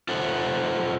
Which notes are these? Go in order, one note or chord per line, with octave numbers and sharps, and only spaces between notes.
F4 A4 C5 F#5